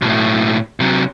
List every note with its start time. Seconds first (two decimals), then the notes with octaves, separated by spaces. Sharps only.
0.02 B1 A2
0.80 C3 F#3